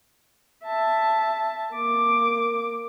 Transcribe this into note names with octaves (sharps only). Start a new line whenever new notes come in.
E5 A5
A#3 D6